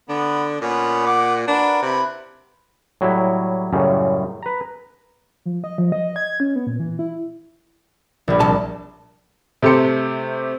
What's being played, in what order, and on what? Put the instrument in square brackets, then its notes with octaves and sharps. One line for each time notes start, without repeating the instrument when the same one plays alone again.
[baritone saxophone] D3 [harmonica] B3
[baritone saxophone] A#2 [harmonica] B3 C#4
[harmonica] F#5 D6
[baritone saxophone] D4 [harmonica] F#4 A#4 B4
[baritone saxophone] C3 [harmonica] E4 B4
[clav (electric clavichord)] A2 F#3 G3 E4
F#2 A2 C#3 G3
B4 A#5
[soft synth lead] F3
D#5
F3
D#5
G#6
C#4
B3
A#2
E3
E4
[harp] A#1 G3
[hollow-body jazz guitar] C2 A5
[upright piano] C3 A3 G4 A4 C6 C#7